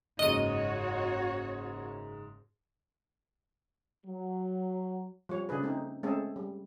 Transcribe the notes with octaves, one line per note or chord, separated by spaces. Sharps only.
F#1 G#2 F#4 C#5 D#5 D#7
F#3
F3 G3 C#5
C#3 D4 G#4 B4
A3 C4 D#4
G#3 A3 C4 C#4 G#4 A4
G3